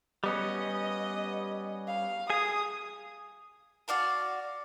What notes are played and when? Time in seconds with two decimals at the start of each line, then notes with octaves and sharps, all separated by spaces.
0.24 G3 B3 C#4 D#5
1.87 F5
2.30 G#4 D#6
3.88 F#4 D5 F5 A5